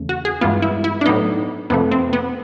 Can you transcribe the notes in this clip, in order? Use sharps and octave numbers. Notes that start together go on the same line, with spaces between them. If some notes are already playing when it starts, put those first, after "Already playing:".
Already playing: E2 C#3 A3
F#4
G#4
G2 E3 G#3 B3 F4
E4
E4
D4
A2 F#3 B3 D#4
F2 C3 F3 A3 B3
C4
B3